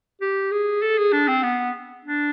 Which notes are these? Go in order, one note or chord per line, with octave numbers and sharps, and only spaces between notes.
G4
G#4
A4
G#4
D4
C4
B3
D4